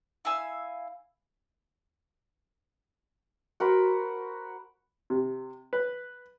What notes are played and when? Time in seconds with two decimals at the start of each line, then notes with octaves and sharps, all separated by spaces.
0.25 E4 F5 G#5 E6
3.60 F#4 A#4 C5 B5
5.10 C3
5.73 B4